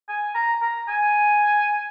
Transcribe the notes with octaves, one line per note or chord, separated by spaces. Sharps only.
G#5
A#5
A#5
G#5